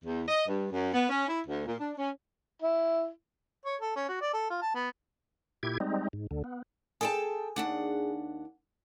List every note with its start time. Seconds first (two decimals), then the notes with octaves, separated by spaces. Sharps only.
0.04 E2
0.28 D#5
0.47 G2
0.72 F#2
0.93 B3
1.09 C#4
1.28 E4
1.47 D2
1.66 A#2
1.79 D4
1.98 C#4
2.62 E4
3.65 C#5
3.81 A4
3.96 C#4
4.09 F#4
4.21 D5
4.34 A4
4.50 F4
4.62 A5
4.75 B3
5.63 A#2 E4 G4 G#6
5.80 G3 G#3 C4 D#4
6.13 G#2
6.31 D2 D3
6.44 B3
7.01 G#4 A4 G5 A5
7.56 D#2 D4 F#5